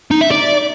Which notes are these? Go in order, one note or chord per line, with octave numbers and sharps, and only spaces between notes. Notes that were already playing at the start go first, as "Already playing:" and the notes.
D#4
E5
D5